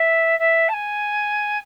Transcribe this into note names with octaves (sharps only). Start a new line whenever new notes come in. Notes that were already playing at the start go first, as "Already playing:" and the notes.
Already playing: E5
E5
A5
G#5